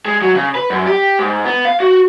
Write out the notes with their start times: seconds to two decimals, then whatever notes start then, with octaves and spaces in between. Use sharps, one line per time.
0.05 G#3
0.22 F#3
0.35 C#3
0.55 B4
0.70 F#2
0.86 G4
1.19 G#2
1.44 B3
1.65 F5
1.80 F#4